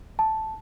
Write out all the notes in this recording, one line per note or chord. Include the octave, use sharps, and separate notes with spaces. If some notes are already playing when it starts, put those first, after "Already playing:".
A5